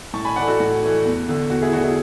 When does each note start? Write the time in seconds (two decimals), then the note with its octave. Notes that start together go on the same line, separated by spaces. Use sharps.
0.13 A2 A5 C#6
0.25 G#5 B5
0.36 E3 A3 D5 F#5
0.48 F#4 A4
0.60 A2 F#4
0.82 E3 A3
1.05 E2
1.27 D3 A3
1.50 E2 F#4
1.62 E4 G#4
1.73 D3 A3 F#4 A4
1.83 E4 G#4